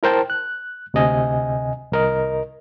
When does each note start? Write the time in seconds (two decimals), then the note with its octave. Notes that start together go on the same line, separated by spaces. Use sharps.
0.03 E4 A#4 C5 G5 A5
0.30 F#6
0.94 D2 C3 D#5 G#5
1.92 C2 A#4 D#5